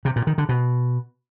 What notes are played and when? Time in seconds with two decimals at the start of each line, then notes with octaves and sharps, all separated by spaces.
0.05 C3
0.16 A#2
0.27 D#3
0.38 D3
0.49 B2